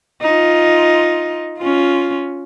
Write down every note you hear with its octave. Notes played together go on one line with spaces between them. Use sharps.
D#4 F4
C#4 F4